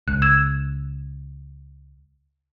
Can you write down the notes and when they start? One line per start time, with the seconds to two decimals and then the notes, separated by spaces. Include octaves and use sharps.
0.08 C#2 F#6
0.22 E6 G#6 E7